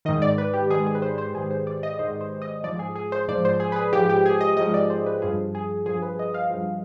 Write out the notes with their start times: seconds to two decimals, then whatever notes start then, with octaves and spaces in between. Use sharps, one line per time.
0.05 D#3 D#5
0.09 G#2
0.22 D5
0.38 B4
0.54 G4
0.70 G#2 D#3 G#4
0.87 G#4
0.95 B4
1.02 C5
1.18 C5
1.35 G#2 D#3 G#4
1.51 C5
1.67 D5
1.83 D#5
1.99 G#2 D#3 C5
2.21 C5
2.42 D#5
2.64 F3 D5
2.67 G#2
2.79 G#4
2.96 G#4
3.12 C5
3.28 G#2 F3 D5
3.45 C5
3.60 G#4
3.72 B4
3.76 G#4
3.93 G#2 F3 G4
4.10 G4
4.26 G#4
4.41 D#5
4.57 G#2 F3 D#5
4.74 D5
4.90 C5
5.06 B4
5.22 G2 F3 G#4
5.55 G#4
5.86 G2 F3 G#4
6.02 B4
6.19 D#5
6.34 F5
6.51 G2 F3